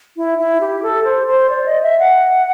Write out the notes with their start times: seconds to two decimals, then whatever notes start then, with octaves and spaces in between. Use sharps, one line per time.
0.17 E4
0.39 E4
0.61 G4
0.83 A4
1.05 C5
1.27 C5
1.50 D5
1.66 D#5
1.83 E5
1.99 F#5